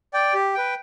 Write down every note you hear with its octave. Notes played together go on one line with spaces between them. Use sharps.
D5 G5
G4
B4 G5